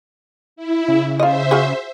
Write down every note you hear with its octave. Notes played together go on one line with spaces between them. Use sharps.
E4
C#3
F4 C5 D#5 E5
F4 F#4 G#4